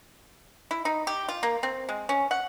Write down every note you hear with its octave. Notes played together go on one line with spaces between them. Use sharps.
E4
D#4
G4
F4
A#3
C4
G#3
C#4
F#5